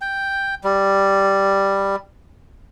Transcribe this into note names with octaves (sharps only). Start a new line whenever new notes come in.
G5
G3